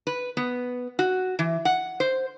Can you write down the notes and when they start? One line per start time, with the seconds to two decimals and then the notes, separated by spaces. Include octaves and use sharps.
0.07 B4
0.37 B3
0.99 F#4
1.39 E3
1.65 F#5
2.00 C5